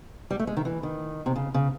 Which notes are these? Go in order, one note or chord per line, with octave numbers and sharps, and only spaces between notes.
G3
A3
G#3
D#3
E3
D#3
C3
C#3
C#3